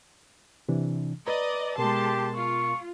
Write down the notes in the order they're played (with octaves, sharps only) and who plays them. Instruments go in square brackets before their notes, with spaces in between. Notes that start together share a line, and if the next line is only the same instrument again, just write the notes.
[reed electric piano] C3 E3 D4
[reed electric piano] B4 A#5 [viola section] D5 D#5
[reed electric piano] B2 B3 A#4 [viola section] G#3 A5 C6 [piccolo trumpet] G4
[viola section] F4 [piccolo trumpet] C#6